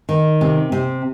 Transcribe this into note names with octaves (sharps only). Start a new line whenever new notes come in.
D#3
C3
C3